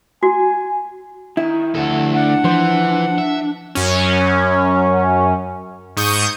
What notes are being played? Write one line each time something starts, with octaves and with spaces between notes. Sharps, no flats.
F#4 G#5
D#3 E4
D2 F3 A4 F#5
D4 F#5
E3 F3 C5
E5
F#2 C#4
G#2 C#6 D#6 G6